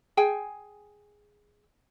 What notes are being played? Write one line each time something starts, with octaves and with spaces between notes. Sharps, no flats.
G#4 G5 G#5